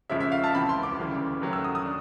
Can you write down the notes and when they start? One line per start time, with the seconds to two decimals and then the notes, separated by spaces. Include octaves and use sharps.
0.10 F2 C#3 F3 G#3 E5
0.20 E5
0.32 F5
0.44 A5
0.53 C#2 C3 E3 B5
0.69 C6
0.83 D6
0.98 D2 C#3 E3 G3
1.42 D#2 C#3 F#3 A3
1.53 E6
1.64 D#6
1.75 D#6
1.86 D4